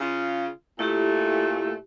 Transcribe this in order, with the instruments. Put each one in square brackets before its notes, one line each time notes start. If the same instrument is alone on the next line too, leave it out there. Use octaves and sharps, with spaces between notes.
[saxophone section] C#3 F4
[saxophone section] A#2 A3 [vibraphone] E4 G4